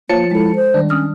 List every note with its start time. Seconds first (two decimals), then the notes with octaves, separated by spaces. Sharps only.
0.09 F3 A#3 C#5 A5 C#7
0.31 G#3 E4 A4
0.56 C5
0.74 D#3 G3 D4
0.90 C#4 D#6 F6